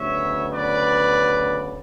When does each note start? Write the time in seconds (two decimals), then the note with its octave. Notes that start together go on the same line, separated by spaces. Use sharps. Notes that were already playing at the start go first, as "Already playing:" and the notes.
Already playing: D2 C#3 F#3 B3 C#5 E5
0.51 B4 D5